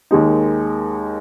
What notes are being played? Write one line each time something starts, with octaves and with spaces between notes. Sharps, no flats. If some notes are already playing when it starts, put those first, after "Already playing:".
D#2 D#3 G#3 D#4